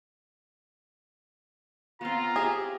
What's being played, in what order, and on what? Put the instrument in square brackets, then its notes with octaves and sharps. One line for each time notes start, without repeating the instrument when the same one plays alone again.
[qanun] B3 C4 [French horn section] F4 [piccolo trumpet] A#5
[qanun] C4 G4 E5 [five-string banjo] G#4